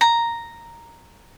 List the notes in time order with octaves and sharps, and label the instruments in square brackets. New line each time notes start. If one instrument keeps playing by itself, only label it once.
[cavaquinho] A#5